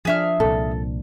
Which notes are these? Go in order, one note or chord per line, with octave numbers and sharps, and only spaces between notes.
F3 D4 G#4 E5 F6
C2 A#2 A4